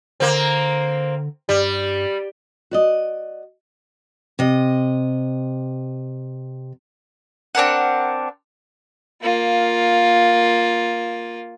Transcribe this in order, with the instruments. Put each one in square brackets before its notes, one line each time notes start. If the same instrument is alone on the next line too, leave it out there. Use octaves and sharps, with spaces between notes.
[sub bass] D3 [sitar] A#3 C4
[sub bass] G2 [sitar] G3
[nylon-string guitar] F#4 D5 D#5
[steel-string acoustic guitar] C3 D#5
[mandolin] C4 D4 A#4 F#5
[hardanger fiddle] A#3 F4